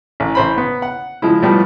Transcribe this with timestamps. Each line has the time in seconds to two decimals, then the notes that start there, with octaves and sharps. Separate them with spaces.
0.20 A1
0.35 A1 C5 B5
0.58 B3
0.82 F#5
1.22 F3 G#3 E4
1.42 A2 F3 G3 B3